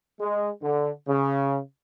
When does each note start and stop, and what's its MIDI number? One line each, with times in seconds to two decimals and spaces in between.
0.21 0.50 56
0.62 0.90 50
1.08 1.58 49